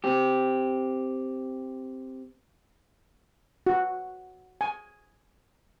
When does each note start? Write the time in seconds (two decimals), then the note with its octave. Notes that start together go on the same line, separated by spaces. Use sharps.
0.04 C4 G4
3.67 F#4
4.61 G#5